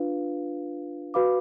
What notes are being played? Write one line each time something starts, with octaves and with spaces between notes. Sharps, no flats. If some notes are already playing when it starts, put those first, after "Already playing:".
Already playing: D4 F4 B4 F5
F#4 B4 F5 B5 D6